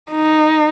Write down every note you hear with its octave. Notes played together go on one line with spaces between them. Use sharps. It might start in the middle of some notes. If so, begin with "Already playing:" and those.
D#4